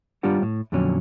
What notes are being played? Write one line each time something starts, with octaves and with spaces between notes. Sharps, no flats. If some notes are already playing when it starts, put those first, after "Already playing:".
G3 D4 F4 G4 F#5
A2
F2 A#2 D3 F#3 C#4